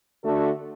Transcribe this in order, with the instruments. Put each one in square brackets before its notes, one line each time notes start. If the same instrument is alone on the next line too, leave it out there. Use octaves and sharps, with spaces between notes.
[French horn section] D3 A3 D4 F#4 A4